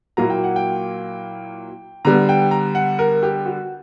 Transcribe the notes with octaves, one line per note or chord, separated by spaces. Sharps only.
A#2 F#3 A#3 E4 A#5
G5
F#5
G5
D3 G3 B3 A#5
G5
A#5
F#5
A#4
G4
F#4